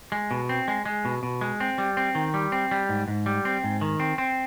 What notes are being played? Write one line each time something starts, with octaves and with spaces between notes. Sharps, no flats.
G#3
B2
C4
G#3
G#3
B2
B2
G#3
C4
G3
C4
D#3
G3
C4
G3
G#2
G#2
G3
C4
G#2
D#3
C4
C4